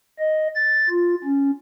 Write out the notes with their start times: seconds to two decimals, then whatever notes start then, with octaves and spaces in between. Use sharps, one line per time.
0.19 D#5
0.55 A6
0.89 F4
1.24 C#4